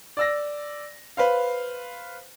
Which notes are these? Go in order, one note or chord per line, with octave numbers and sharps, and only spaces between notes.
D5 E6 A#6
B4 C5 F5